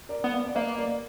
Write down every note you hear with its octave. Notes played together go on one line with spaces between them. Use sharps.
A#4 D5
B3
D5 F5
D5
A#3 B4 D#5
A#4 D5